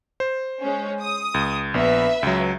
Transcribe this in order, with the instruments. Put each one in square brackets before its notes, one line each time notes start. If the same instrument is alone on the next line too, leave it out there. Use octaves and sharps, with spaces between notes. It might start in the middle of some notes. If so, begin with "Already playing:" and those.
[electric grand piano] C5
[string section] G#3 C#4
D#6
[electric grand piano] C#2
[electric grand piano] A#1 B3 [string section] B4 E5
[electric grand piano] C#2 F#3